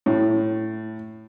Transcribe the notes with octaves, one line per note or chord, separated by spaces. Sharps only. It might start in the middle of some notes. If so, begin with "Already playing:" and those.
A2